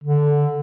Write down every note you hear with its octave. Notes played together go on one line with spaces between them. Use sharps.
D3